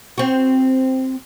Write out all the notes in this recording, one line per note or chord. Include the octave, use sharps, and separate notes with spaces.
C4 F#4